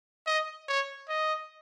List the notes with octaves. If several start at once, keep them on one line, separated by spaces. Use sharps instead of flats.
D#5
C#5
D#5